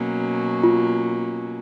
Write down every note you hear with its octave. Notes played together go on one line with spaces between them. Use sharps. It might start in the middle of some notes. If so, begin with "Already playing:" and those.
Already playing: B2 F#3 A#3 C#4
F4